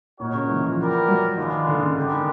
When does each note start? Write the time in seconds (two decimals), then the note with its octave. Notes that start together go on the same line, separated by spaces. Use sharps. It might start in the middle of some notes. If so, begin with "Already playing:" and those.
0.20 A#2 D#4 F#4 A#4 C#5
0.35 C#3
0.49 E3
0.64 F3
0.79 B3 E4 G4 A#4 D5
1.08 F#3
1.37 D#3 G#3 B3 D4 F4
1.67 D3
1.82 C#3
1.97 D3 G#3 B3 D4 G4 A#4
2.12 D#3